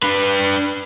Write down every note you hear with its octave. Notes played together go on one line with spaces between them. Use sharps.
D4 B4